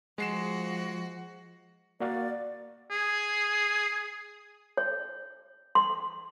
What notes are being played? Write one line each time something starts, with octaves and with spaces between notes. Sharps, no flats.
F3 G#3 F#4 C7 E7
A#3 F#4 D5 F5
G#4
C#5
C6